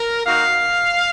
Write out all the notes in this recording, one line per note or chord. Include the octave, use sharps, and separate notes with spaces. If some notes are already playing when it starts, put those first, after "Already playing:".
Already playing: A#4
A#3 D#4 F#4 F5